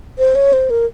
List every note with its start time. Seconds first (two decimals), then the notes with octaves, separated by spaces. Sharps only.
0.19 C5
0.35 C#5
0.53 C5
0.70 A#4